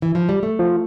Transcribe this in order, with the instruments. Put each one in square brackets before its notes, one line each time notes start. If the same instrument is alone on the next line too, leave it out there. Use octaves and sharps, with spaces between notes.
[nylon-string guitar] E3
F3
G3
A3
[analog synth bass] F3